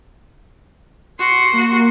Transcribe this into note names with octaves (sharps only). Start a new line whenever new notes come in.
F#4 C6
A#3